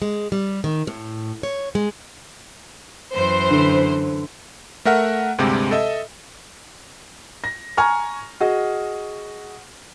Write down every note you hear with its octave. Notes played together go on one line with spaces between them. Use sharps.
G#3
G3
D#3
A2
C#5
G#3
F#2 E3 C5
D3
A3 A#4 E5 F#5 F6
D2 G2 C3 G#3 C4 G4
A4 D#5 E5
A#6
G#5 A#5 C#6 F6
F#4 G#4 D#5